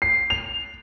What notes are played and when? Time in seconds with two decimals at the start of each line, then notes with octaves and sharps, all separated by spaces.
0.02 C7
0.30 F7